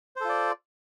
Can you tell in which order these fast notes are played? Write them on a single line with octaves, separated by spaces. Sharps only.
C5 A4 F4 D5